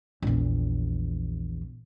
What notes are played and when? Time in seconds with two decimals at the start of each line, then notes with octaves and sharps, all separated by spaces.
0.22 A#1 E2